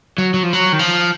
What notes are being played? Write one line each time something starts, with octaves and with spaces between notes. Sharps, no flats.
F#3
F#3
F3
F#3
D#3
F3